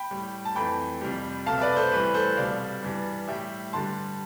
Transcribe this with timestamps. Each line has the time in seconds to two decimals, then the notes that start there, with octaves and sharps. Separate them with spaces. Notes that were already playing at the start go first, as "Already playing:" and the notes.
Already playing: G5 B5
0.11 A2 G3
0.45 A5
0.55 F2 E3 A3 G5 B5
1.01 F2 C3 G3
1.46 C2 B2 A3 F5 A5
1.58 E5
1.61 B4 D5
1.76 A4 C5
1.92 A2 E3 G3 B4
2.14 A4 C5
2.36 C2 B2 G3 D5 F5
2.83 G2 E3 G3
3.28 A2 G3 E5 G5
3.73 G2 D3 G3 A5 C6